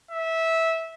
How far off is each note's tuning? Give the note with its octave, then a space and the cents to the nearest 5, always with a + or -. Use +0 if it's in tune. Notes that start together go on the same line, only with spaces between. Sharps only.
E5 -15